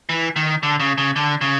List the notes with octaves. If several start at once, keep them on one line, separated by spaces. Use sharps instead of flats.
E3
D#3
D3
C#3
C#3
D3
C#3